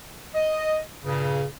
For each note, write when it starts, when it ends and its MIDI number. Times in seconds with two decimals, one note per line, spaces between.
0.35 0.80 75
1.05 1.46 43
1.05 1.46 46
1.05 1.46 49